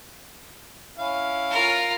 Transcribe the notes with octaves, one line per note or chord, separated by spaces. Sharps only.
C#4 E4 F5
F4 A#4